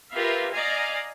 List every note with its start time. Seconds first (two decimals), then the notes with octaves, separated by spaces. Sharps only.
0.12 F4 G4 A#4 B4 E5 F5
0.52 D5 D#5 F5 G#5 A#5